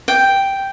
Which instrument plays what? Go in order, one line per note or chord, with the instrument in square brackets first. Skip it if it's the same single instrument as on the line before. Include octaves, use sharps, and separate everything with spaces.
[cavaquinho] G5